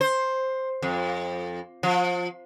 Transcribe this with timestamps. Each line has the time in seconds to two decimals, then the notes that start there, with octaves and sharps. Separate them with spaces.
0.01 C5
0.82 F2
1.83 F3